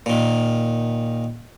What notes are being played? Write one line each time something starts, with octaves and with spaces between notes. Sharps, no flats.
A#2 D#3